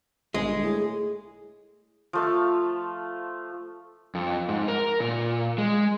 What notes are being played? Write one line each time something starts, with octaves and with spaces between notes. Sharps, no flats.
G1 G#3
A2 G#4
F3 A3 F5
F2
G#2
A#4
A#2
G#3